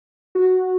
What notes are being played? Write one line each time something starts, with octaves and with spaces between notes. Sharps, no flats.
F#4